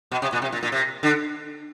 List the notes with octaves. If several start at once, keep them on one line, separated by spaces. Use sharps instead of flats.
B2
C3
A#2
C3
A#2
A#2
C3
D3